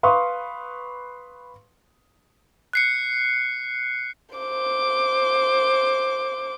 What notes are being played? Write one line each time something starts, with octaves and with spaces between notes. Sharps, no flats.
B4 F5 C6 C#6 D#6
F#6 C7 C#7
C5 D6